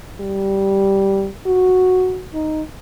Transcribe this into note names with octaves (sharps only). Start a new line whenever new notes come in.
G3
F#4
D#4